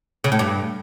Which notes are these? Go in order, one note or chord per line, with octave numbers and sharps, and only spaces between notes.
C#3
A2
G2